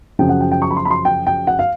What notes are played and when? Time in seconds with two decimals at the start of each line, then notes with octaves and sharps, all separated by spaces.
0.19 F#2 C#3 F3 G5
0.29 F#5
0.41 G5
0.51 G5
0.62 C#6
0.71 B5
0.76 C6
0.85 B5
0.91 C6
1.05 G5
1.27 G5
1.47 F#5
1.59 F5